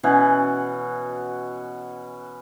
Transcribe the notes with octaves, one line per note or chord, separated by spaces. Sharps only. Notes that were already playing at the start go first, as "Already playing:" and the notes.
B2 E3 C#4 F#4